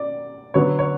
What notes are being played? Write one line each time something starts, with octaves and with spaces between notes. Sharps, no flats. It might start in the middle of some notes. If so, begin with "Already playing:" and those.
Already playing: D5
D3 F#3 B3 C#5
C#5